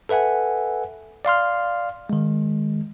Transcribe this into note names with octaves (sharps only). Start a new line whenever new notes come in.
A4 B4 E5 F#5 G#5
D5 F5 C6 F6
D#3 G#3